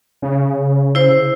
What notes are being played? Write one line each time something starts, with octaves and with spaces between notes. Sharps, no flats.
C#3
E4 C5